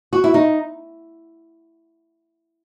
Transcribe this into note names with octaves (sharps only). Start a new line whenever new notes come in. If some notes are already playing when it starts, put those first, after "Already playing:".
F#4
E4
D#4